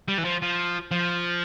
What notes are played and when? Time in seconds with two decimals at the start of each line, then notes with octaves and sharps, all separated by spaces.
0.08 G3
0.18 E3
0.24 F3
0.42 F3
0.91 F3